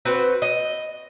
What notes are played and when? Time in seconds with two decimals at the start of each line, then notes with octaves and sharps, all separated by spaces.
0.05 C4 F#4 B4
0.42 D#5